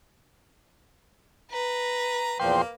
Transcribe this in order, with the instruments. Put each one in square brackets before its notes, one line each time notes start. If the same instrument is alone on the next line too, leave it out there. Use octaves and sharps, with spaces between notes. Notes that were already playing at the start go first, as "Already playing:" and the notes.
[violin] B4 [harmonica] A#5
[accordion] E2 A#2 F3 [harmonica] A#3 [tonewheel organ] G5 C6